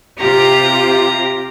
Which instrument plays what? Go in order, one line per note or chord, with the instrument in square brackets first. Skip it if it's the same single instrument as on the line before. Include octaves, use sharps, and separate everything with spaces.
[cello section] C3 F4 G4 [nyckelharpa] A#5